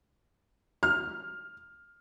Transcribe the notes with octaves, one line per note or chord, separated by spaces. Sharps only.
F6